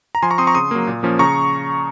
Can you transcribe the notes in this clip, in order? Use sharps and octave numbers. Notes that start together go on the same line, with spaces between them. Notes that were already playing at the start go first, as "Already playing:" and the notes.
A#5
F3 G#5 C6
A#5 C#6
C4 C6 D#6
A#5 C#6
C#3 C6 D#6
F#3 A#3
A#2
F3 A#3 C#4
C#3 A#5 C#6